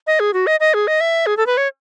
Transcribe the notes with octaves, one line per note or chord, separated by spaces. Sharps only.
D#5
G#4
F#4
D#5
D#5
G#4
D#5
E5
G#4
A4
B4
C#5